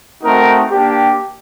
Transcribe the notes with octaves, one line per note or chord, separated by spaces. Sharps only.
A3 C4 D#4 F#4 A#4
A#3 D4 G4